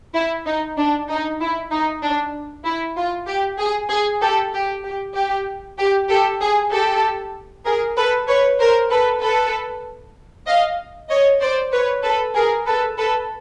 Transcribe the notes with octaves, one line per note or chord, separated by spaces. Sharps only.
E4
D#4
D4
D#4
E4
D#4
D4
E4
F4
G4
G#4
G#4
G4 A4
G4
G4
G4
G4
G4 A4
G#4
G4 A4
G#4 A#4
A4 B4
B4 C#5
A#4 C5
A4 B4
A4 B4
D#5 F5
C#5 D#5
C5 D5
B4 C#5
A4 B4
G#4 A#4
A4 B4
A4 B4